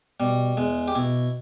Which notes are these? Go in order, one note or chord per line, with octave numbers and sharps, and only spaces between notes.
B2 G3
E2 G#3
G4
B2 E4